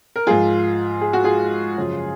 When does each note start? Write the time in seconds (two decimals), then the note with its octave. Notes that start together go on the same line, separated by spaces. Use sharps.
0.16 A#4
0.27 G#2 F3 F4 G#4
1.01 G#4
1.13 F#4
1.24 F4 G#4
1.77 F#2 C#3 F3